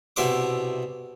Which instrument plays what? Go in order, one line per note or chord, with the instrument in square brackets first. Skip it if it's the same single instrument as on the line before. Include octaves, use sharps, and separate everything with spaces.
[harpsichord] C2 B2 E4 C6 D6